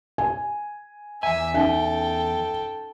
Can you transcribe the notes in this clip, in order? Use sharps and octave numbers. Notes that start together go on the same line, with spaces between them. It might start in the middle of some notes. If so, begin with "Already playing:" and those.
G#5
E2 E5 G#5
C#4 D#4 A4 E5 G5